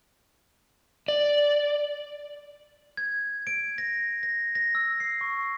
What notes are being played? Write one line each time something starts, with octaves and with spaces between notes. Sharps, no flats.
D5
G#6
D7
A#6
A#6
A#6
E6
C7
C#6